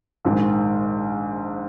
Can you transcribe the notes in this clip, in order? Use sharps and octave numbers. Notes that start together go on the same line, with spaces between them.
A#1 G#2 D#3 G#3